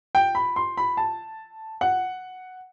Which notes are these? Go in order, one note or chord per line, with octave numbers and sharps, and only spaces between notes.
G5
B5
C6
B5
A5
F#5